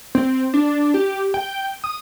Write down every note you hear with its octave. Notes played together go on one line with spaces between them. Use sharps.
C4
D4
G4
G5
D#6